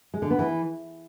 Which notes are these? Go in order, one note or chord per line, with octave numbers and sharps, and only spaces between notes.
G#3
D3
B3
E3